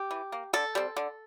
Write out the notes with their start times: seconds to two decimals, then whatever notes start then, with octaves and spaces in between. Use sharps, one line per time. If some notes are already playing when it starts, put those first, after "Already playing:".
Already playing: G4
0.11 E3
0.32 A#3
0.53 D3 A4
0.75 G3 C4
0.97 D3